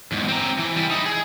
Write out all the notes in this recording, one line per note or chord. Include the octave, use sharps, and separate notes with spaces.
E2 G#2
C4 A#5
E3
G3 E4
D#4 E4
G#4